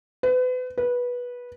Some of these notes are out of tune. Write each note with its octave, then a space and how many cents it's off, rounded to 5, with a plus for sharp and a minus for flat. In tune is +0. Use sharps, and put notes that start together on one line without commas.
B4 +35
B4 -15